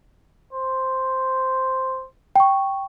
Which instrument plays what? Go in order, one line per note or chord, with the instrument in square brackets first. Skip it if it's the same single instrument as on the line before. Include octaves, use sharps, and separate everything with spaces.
[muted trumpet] C5
[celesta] G5 C#6